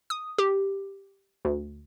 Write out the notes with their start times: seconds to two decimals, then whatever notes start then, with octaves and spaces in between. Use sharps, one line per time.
0.10 D#6
0.38 G4
1.45 D2